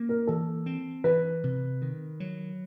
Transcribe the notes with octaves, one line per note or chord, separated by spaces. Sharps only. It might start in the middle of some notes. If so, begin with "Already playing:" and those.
Already playing: A#3 C#4
A#4
E3 A4
C4
E3 B4
C3
D#3
F#3